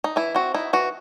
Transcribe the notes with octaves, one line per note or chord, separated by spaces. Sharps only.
D#4
E3 E4
C4 F#4
D#4 E4
E3 F#4